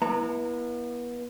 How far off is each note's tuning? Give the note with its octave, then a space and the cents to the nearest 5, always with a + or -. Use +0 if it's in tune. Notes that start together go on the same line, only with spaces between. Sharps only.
B3 -35 E4 -5 A#5 -25